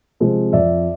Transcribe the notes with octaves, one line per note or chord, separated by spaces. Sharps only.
C3 F3 G#3 C4
F2 D5 E5